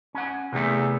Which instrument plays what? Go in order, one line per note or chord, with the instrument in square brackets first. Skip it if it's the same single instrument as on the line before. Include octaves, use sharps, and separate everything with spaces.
[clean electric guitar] C#4 F#5
[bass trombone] E2 [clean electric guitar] C3 A3